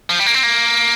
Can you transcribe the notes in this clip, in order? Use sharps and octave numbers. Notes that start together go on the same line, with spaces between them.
F3
G3
A#3
C4
A#3